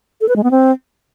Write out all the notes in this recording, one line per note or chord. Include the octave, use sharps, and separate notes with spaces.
A4
B4
G#3
B3
C4